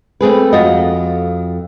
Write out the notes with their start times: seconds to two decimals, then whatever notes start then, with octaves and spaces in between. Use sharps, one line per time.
0.21 A3 C4 G#4 B4
0.53 F2 F4 F#4 D#5